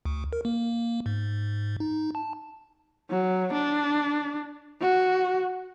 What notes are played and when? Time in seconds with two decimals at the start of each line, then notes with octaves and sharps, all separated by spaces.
0.05 D2
0.33 A#4
0.45 A#3
1.06 G#2
1.80 D#4
2.15 A5
3.10 F#3
3.53 D4
4.81 F#4